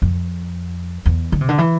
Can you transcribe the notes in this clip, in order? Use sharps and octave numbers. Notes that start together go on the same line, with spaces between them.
F2
E2
D3
C3
D3
E3